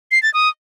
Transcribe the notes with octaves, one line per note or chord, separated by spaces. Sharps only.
C7
A6
D#6